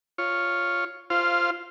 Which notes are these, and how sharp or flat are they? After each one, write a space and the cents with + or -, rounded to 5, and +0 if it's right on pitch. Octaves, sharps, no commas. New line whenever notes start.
F4 +0 C#5 +0
F4 -15 C5 +0 F5 +0